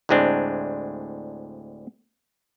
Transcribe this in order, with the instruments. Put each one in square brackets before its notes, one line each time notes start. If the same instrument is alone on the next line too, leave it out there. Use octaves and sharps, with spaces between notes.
[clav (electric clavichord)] D2 A2 G#3 C4 D4